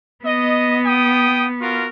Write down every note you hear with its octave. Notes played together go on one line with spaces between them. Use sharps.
B3 D#5
G5 D#6
F4 F#4 A#4